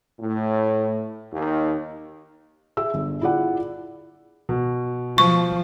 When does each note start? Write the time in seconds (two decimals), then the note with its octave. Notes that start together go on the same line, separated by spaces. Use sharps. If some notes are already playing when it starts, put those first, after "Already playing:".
0.20 A2
1.33 D#2
2.77 G#4 E5 E6
2.94 G1
3.21 E4 F4 G#4 D5 F#5
4.49 B2
5.18 F3 C#6